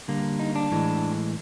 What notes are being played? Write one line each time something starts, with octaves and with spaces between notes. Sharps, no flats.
D3 G3 A#3
D#4
D4
A2 E3 G#3